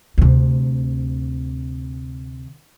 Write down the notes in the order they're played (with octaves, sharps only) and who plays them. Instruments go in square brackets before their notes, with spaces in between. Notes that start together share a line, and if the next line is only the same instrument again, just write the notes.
[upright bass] D2 C3